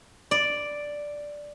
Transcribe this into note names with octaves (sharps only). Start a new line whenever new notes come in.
D5